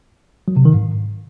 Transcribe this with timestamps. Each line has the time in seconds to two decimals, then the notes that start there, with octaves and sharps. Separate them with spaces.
0.48 F#3
0.57 C3
0.65 D#3
0.74 G#2